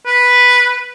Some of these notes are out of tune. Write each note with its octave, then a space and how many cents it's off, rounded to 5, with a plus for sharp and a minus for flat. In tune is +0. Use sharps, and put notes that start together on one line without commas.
B4 -5